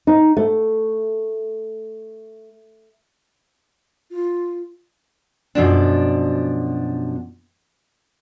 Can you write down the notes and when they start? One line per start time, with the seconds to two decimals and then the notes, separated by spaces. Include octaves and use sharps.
0.07 D#4
0.37 A3
4.11 F4
5.55 F#2 B2 F3 D4